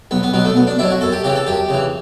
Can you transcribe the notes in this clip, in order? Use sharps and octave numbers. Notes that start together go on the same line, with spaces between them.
B1 B3
B3
B2 F#3 B3
A3
B1 B3
D4
B2 F#3 E4
F#4
F#2 A4
G4
C#3 E3 G4
A4
F#2 G4
C#3 E3